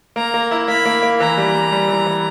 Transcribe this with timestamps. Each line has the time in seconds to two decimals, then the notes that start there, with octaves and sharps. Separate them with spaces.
0.16 A#3 A#5
0.34 A#3
0.51 E4
0.68 A#3 B5
0.86 A#3
1.03 A#3
1.20 E3 A#5
1.37 G3
1.55 G3
1.72 G3
1.89 E3
2.06 E3